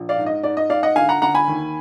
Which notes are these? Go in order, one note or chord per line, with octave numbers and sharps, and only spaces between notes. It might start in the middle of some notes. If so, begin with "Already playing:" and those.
Already playing: A#1
D5 F5
G#2
D#5
G#2 D5
D#5
G#2 D5 F5
D#5 F#5
D3 F5 G#5
F#5 A#5
D3 F#5 A#5
G#5 B5
D#2